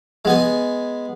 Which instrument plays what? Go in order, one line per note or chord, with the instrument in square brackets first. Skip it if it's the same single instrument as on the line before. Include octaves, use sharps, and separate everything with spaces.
[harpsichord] G#3 B3 G#5